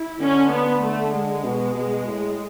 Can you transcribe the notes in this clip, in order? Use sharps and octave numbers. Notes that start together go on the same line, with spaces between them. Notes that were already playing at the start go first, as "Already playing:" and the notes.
Already playing: E4
D3 C#4
B3
A3
G#3
B2
B2
A2